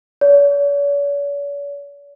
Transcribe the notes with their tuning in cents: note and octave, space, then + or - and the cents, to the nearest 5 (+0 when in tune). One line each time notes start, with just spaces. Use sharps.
C#5 +45